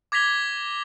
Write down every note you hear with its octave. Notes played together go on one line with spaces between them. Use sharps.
D6 G#6 A#6 B6 F7 G7